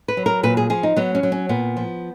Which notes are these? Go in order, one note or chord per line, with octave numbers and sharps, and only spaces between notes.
B4
F#3
A#4
A#2 B4
G#4
F3 G#4
D#4
F#3 B3
C#4
F#3
C#4
A#2 B3
F3